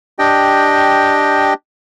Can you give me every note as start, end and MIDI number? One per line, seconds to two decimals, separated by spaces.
0.19 1.54 62
0.19 1.54 67
0.19 1.54 75
0.19 1.54 79